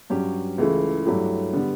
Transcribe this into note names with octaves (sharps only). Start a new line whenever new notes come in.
G2 F#3 C#4 G4
C#2 C#3 E3 A3 E4
G2 F#3 A3 E4 G4
D3 G3 B3